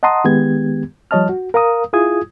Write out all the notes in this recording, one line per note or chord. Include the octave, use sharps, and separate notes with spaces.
D#5 F#5 A5 A#5 C6 D#6
D#3 G#3 B3 G4 G#6
F3 G3 C#5 D#5 A5 F6
F#4
A#4 F5 A#5 D#6
E4 F4 G#4 D#6 G#6